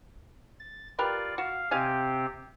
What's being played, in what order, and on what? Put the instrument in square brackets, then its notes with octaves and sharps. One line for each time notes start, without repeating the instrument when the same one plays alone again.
[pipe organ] A6
[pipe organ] F4 D5 [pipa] G4 A#4 B4
[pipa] F#4 [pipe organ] F5
[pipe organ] C3 C4 G4 [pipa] D#5 F5 G#5